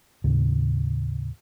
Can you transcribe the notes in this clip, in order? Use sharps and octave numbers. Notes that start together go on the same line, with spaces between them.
D#2 A2 C#3